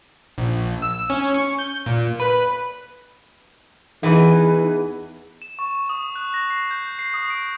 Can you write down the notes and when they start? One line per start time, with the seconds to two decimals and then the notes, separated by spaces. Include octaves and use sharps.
0.38 A#1
0.82 E6
1.10 C#4
1.34 C#6
1.59 G6
1.86 A#2
2.20 B4
4.03 E2 E3 D#4 B4
5.42 E7
5.59 C#6
5.89 D#6
6.16 F#6
6.34 A#6
6.50 C7
6.71 G6
6.99 C7
7.14 D#6
7.30 D7